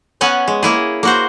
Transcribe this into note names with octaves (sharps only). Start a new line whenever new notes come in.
B3 C#4 F#5 G#5
G#3
A#3 E4 G#4
A#3 F#4 C5